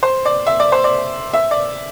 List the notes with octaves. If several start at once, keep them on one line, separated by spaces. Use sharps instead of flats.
C5
D5
E5
D5
C5
D5
E5
D5